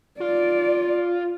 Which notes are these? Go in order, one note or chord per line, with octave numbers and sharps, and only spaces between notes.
F4 D5